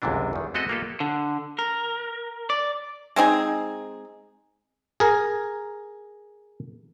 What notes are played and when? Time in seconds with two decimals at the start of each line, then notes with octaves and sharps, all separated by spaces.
0.02 G1 C#2 F#2 C3 E3 D4
0.33 E2 D#3
0.54 G#3 B3 C4 F#4 A4 D#5
0.68 G#3 A#3 B3 F4 G4 A4
1.00 D3
1.59 A#4
2.50 D5
3.16 G#3 C4 D#4 G#4
5.00 G#4 A#4 A#5